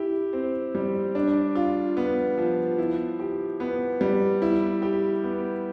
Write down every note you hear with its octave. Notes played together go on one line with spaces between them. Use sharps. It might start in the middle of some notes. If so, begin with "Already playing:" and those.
Already playing: E4 G4
C4
G3
D4
F4
B3
F3
E4
G4
B3
G3
E4
G4
B3